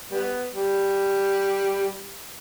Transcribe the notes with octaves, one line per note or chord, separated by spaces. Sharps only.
G3 B3
G3